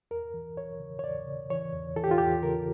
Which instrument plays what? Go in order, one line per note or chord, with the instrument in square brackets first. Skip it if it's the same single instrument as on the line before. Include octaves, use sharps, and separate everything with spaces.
[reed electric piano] E2 A#4
E3
E3 C#5
C#3
C#5
E2 D5
C#3
E3 C#5
E2
E3 A4
G4
F4
E2 G4
C#3 A#4